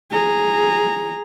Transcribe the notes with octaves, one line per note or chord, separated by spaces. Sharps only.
G#4 A#5